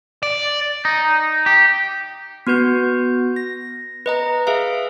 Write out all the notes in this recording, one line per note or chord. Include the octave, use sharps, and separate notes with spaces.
D5
D#4
G4
B3 F#4 B4 G6
A#6
B4 D#5 A#5
G#4 B4 E5 F5